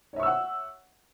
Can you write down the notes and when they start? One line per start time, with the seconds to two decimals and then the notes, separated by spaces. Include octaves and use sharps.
0.13 C#5
0.16 E5
0.20 C#6
0.23 E6
0.26 F#5